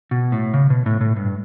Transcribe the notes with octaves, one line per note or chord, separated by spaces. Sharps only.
B2
A2
C#3
B2
A2
A2
G2